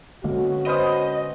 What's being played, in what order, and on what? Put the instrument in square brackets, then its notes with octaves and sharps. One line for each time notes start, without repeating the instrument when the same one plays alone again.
[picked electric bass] D3 G#3 A#3 [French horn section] B3 C#4 F#4
[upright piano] B4 C5 D#6 [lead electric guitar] D#5